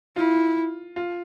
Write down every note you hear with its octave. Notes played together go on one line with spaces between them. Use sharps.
E4 F4
F4